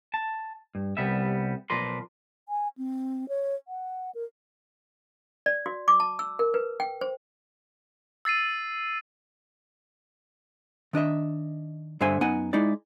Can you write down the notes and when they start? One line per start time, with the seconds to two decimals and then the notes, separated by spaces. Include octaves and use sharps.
0.14 A5
0.75 G2
0.97 C2 G3 B3 E5
1.70 B1 F3 A#4 B4 D5 C6
2.49 G#5
2.77 C4
3.29 C#5
3.68 F#5
4.15 A#4
5.46 D5
5.66 F#4
5.88 D6
6.00 A5
6.19 E6
6.39 A#4
6.54 B4
6.80 G5
7.01 C5
8.25 E6 A6 C7 D#7
10.93 D#3 D4 D#5 E5
12.01 G2 D3 C5 E5 G#5
12.21 F#2 B3 D#4 F#5 G#5
12.53 G#3 D#4 E4 D5